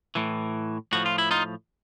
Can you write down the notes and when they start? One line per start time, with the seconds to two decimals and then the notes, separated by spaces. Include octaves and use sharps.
0.15 A2 E3
0.93 A2 F3 F#4
1.06 F4
1.18 E4
1.31 D#4 F4